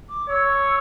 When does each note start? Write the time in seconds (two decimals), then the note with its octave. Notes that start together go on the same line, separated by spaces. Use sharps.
0.09 D6
0.29 C#5 E6